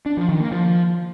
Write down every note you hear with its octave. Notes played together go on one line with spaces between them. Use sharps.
D4
F3
D#3
A#3
F3